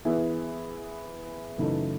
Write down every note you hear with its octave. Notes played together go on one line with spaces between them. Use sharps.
E3 B3 E4 G#4
F#2 C#3 E3 A3 D#4